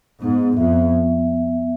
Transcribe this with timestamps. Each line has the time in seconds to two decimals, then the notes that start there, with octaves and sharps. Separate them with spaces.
0.21 G#2 B3
0.57 F2 E5